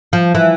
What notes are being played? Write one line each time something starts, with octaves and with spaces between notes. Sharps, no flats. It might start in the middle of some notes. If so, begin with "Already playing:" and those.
F3
E3